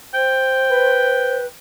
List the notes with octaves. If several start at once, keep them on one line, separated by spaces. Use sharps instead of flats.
C5 G5
B4